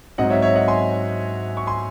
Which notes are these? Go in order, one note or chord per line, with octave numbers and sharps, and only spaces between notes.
G#2 F#3 C4 D#5 F#5
C#5 E5
C#5 E5
D#5 F#5
G#5 C6
C#6
G#5 C6